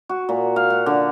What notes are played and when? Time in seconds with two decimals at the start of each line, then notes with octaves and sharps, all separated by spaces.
0.09 F#4
0.29 A#2
0.56 F5
0.70 F#5
0.86 D3